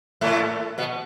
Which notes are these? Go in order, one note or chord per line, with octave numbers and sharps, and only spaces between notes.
A2 A3
B2 B3